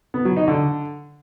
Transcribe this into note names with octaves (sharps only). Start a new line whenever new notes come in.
B3
F#3
D#4
D3